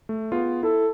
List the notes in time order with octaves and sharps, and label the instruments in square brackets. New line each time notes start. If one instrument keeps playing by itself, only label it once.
[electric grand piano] A3
B3 F4 G#4
[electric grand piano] E4 [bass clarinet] A4